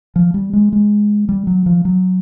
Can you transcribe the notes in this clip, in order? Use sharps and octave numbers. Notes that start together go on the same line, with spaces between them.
F3
G3
G#3
G#3
G3
F#3
F3
F#3